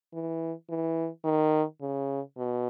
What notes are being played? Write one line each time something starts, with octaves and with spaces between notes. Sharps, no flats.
E3
E3
D#3
C#3
B2